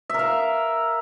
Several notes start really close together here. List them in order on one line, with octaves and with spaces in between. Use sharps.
E5 A#4 F5